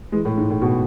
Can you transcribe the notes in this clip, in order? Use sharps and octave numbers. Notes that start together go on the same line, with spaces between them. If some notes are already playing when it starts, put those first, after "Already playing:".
E3 G#3
A2
G#2
A2
B2